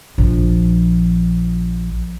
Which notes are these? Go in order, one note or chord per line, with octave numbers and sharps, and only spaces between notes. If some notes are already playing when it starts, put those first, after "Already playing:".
A#1 F3